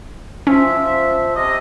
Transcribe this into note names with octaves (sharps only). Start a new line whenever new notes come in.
F3 C#4 E5
C3 D#5